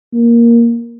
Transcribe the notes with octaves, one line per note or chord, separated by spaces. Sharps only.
A#3